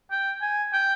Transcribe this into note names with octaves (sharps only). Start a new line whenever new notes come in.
G5
G#5
G5